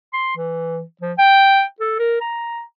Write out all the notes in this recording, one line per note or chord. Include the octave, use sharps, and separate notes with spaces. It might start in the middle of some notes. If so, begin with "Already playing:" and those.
C6
E3
F3
G5
A4
A#4
A#5